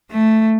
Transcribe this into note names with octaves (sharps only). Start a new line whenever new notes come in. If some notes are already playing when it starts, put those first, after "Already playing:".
A3